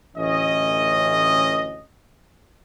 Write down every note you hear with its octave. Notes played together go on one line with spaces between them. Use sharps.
A1 D2 E3 C#4 D#5